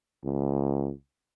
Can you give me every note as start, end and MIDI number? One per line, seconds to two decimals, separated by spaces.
0.24 0.91 37